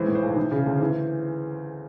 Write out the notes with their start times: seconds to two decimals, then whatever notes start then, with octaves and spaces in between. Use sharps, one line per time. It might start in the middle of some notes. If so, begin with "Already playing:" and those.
Already playing: G#1 E3 C5
0.08 A2
0.15 C5
0.23 B1
0.36 E3
0.52 C#3
0.66 D2
0.80 E3